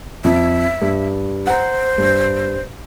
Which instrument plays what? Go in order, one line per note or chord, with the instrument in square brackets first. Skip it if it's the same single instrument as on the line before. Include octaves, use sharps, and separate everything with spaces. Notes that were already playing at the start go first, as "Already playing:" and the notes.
[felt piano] F2 [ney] E5
[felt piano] G2
[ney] C5 [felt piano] F#5 A#5
[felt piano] G2